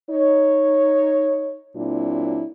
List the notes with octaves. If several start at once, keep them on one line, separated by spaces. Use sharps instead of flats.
D#4 C#5
A#2 F#3 C4 D4 E4